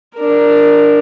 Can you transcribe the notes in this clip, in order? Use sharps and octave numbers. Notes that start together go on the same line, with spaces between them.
D4 A#4